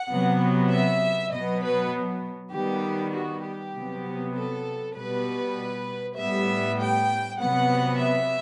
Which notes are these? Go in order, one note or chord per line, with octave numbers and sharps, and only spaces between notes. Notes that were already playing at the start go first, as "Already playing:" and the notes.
Already playing: F#5
C3 F#3 B3
E5
B2 F#3 B3 D#5
B4
D#3 G3 B3 G4
F#4
G4
C3 F#3 B3
A4
B2 G3 B3 B4
A2 G3 B3 E5
G5
C3 F#3 B3 F#5
E5